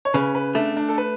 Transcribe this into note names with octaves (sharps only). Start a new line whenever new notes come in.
C#5
C#3 B4
B4
A3 D4
D4
A4
B4